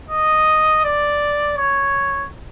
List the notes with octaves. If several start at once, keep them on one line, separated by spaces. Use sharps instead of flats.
D#5
D5
C#5